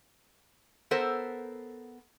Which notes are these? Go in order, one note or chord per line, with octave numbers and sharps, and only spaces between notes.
B3 A4 A#4 C5